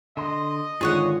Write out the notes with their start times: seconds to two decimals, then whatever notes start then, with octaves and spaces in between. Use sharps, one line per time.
0.17 D3 D#5 C6
0.81 G#1 D3 D#3 F4 G#4 C#5 F#5